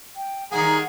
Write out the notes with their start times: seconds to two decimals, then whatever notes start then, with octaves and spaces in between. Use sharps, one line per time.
0.16 G5
0.51 D#3 G3 A#3 G#4 F#5 A#5